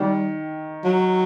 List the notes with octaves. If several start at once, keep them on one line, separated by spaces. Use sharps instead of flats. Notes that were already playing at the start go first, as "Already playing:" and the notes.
Already playing: D#3 G3
F#3